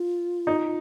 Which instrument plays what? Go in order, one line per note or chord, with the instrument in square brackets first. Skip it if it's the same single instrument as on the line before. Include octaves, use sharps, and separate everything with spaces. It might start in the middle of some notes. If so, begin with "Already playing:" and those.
Already playing: [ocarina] F4
[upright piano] D#4